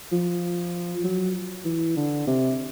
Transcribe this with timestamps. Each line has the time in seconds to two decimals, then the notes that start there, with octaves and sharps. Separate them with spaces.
0.12 F3
1.04 F#3
1.65 E3
1.96 D3
2.27 C3